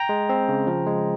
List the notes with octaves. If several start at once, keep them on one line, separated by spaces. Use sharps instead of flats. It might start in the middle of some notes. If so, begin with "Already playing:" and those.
Already playing: G5 A#5
G#3
C4
C#3
F3
G#3